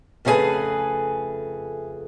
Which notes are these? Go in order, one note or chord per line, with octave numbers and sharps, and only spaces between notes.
F2 C#3 A3 C#4 G#4 B4